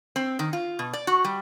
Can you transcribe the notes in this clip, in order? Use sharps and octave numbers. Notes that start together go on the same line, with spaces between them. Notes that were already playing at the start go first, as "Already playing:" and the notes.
C4
D#3
F4
B2
D5
F#4
G3